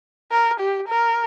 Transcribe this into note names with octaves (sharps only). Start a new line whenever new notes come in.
A#4
G4
A#4